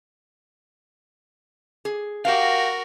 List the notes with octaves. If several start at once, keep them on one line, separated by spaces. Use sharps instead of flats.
G#4
F#4 G4 A#4 F5